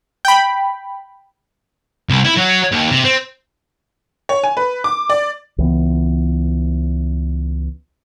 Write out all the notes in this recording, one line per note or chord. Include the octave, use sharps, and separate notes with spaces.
G5 B5
C2
E4
F#3
D#2
C3
C4
C#5
G#5
B4
D6
D5
C#2 E3 B3